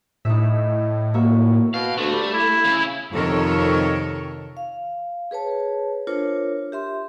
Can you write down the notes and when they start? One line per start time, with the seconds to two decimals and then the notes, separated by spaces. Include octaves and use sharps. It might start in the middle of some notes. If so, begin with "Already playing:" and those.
0.25 A2 D#4 E5
1.14 A#3 F#4 E5
1.74 B2 F5
1.98 D2 A3
2.13 G3
2.34 E4
2.65 C#3
3.12 F2 C3 D#3 A4 A#4 C#5
4.57 F5
5.31 G#4 B4 C#5 A5
6.07 D4 F4 A#4 C5 C#5
6.72 G4 E5 C6